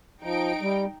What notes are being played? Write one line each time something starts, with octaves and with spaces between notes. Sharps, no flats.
F3 D#4 G5 D7
G3